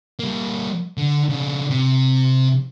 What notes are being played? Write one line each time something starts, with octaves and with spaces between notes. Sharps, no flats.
G3 A#3
D3
C#3 D4
C3